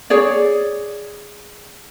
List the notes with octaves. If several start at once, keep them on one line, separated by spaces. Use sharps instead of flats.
G#4 C#5 D5